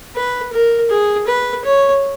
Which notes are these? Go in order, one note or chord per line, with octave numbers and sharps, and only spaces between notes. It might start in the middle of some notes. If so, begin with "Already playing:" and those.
B4
A#4
G#4
B4
C#5